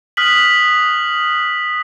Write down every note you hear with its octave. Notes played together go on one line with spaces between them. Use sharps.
D#6 F6 F#6 B6 F#7